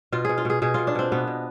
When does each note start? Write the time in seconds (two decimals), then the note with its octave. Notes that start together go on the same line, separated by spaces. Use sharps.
0.12 B2 F4
0.25 B2 G#4
0.38 F4
0.45 B2 G#4
0.62 B2 G#4
0.74 B2 F4
0.87 D4
0.95 B2 C4
1.12 B2 B3
1.27 B2